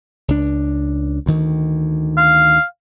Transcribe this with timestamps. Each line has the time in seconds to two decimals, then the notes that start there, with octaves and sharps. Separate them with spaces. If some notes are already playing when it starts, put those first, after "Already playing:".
0.28 C#2 D4
1.26 D2 D#3
2.18 F5